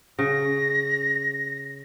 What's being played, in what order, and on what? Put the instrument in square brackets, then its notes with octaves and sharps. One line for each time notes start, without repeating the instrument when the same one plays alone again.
[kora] C#3 [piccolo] A#6